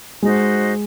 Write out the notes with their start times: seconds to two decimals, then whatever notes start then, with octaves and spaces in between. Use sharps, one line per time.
0.22 G#3 D#4 F#4 C5